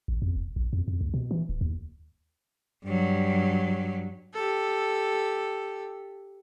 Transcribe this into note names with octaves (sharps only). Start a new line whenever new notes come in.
A1
F2
E1
A#1
F2
F2
D2
B2
E3
D1
D#2
G2 F#3
G4 A4